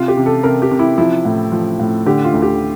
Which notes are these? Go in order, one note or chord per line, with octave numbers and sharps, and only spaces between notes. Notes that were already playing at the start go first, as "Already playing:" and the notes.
Already playing: C3 F4
G4
C3
A4
C3 A#4
G4
C3
E4
F3 E4
A2
F3
A2
D3 G4
F4
D2
G4